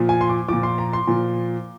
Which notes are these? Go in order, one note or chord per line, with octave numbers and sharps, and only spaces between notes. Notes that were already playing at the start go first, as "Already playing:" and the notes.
Already playing: A#2 F3
G#5
C6
D6
A#2 F3 D6
C6
A#5
C6
A#2 F3